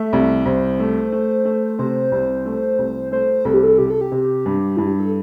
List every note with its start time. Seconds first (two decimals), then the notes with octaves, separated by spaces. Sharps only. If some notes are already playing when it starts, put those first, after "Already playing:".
Already playing: A3 E5
0.13 C2
0.45 C2 C5
0.80 A3
1.12 A3
1.45 A3
1.79 C3 C5
2.12 C2
2.46 A3
2.78 C2
3.11 A3 C5
3.45 C2 A4
3.54 G4
3.63 A4
3.78 C3 G4
3.90 A4
4.01 G4
4.12 C3
4.46 G2
4.77 G2 E4
4.88 G4
5.00 A4